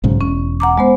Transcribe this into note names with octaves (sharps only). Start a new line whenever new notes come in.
B1 G#2 C#3
E1 C#4
F#5 A#5 D6
G#3 B3 C5